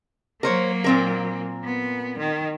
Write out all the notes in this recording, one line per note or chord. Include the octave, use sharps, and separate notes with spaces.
F#3 A#3 A#4 C5 C#5
A#2 C4 A#4
B3
D#3